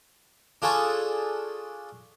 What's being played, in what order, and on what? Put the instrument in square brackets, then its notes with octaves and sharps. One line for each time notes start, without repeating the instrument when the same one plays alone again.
[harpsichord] D4 F4 G#4 A4 C#6